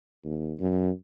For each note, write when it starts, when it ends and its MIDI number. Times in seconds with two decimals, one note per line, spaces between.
0.25 0.54 39
0.60 0.90 42